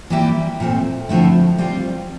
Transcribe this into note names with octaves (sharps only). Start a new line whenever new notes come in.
E3 G3 A#3 E4 G4
A#2 A3 C4
D3 F3 A3 C4 E4
G3 C4 F4